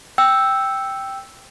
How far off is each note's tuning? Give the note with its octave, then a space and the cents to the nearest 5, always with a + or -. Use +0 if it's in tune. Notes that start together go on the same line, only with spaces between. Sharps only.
G5 +0 E6 +0